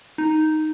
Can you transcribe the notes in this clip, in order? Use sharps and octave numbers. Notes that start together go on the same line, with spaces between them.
D#4